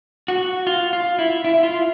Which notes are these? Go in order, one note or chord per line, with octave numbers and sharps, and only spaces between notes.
F#4
F4
F4
E4
E4
F4